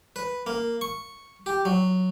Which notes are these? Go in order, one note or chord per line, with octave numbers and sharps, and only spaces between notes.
B4
A#3
C#6
G4
F#3